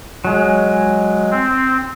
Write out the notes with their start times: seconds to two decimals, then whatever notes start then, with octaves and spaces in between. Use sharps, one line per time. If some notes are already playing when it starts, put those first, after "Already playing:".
0.25 F#3 G#3
1.31 C4